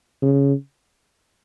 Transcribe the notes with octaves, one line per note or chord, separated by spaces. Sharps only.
C#3